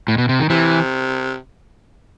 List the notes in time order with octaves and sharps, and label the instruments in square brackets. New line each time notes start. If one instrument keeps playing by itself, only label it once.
[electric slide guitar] A2
B2
C3
D#3
[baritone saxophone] C3 [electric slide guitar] E3